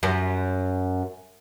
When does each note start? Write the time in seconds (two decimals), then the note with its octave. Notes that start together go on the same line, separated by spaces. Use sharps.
0.03 F#2